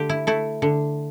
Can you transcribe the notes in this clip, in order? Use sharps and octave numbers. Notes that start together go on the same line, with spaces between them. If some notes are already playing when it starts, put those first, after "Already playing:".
Already playing: D3 A3 G4
E4
A3 E4
D3